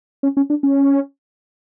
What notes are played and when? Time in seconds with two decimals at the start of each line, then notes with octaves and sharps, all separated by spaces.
0.23 C#4
0.37 C#4
0.50 D4
0.63 C#4